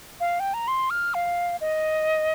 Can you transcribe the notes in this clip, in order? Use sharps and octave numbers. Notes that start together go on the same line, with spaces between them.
F5
G5
A#5
C6
F6
F5
D#5